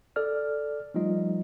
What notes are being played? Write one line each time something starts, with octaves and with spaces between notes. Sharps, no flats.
A4 D5 F6
F3 G3 A3 D#4 F4 D#5